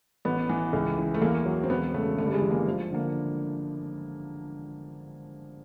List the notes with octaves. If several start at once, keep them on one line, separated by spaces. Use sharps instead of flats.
A1 B3
E3
C#2
E3
A3
E2 A#3
F#3
C4
E1 B3
C#3 A3
G1 A3
G3
G#3
E3
A#3
F3
D3 A#3